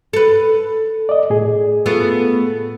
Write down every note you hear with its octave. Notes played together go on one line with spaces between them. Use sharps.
A4 B4
D5 D#5
A2 G#4
A3 B3 F4